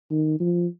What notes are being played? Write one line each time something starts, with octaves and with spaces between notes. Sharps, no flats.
D#3
F3